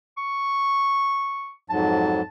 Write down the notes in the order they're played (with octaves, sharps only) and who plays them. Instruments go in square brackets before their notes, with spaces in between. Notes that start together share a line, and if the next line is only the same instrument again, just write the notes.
[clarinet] C#6
[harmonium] F2 G#2 F#3 [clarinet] A5